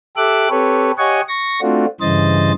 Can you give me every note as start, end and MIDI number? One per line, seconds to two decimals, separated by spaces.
0.16 0.48 67
0.16 0.48 69
0.16 0.48 76
0.16 0.48 86
0.16 0.48 90
0.50 0.91 60
0.50 0.91 67
0.50 0.91 69
0.50 0.91 71
0.50 0.91 73
0.98 1.21 67
0.98 1.21 73
0.98 1.21 75
0.98 1.21 78
0.98 1.21 80
0.98 1.21 85
1.28 1.60 85
1.28 1.60 94
1.62 1.86 57
1.62 1.86 60
1.62 1.86 62
1.62 1.86 65
1.62 1.86 66
2.01 2.52 43
2.01 2.52 49
2.01 2.52 52
2.01 2.52 72
2.01 2.52 75
2.01 2.52 93